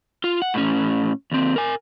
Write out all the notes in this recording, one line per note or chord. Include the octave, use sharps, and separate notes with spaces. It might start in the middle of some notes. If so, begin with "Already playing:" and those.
F4
F#5
A2 C#4
D#2 C4
A#4 G#5